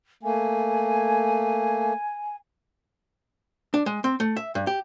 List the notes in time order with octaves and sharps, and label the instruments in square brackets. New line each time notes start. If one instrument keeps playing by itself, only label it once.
[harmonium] A3 A#3 [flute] G#5
[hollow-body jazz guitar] D4
G#3
C4
A3
E5
G2
G4